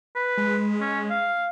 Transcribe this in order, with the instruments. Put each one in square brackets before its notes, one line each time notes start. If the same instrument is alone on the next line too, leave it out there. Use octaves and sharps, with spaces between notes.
[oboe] B4
[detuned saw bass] G#3
[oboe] C#4
F5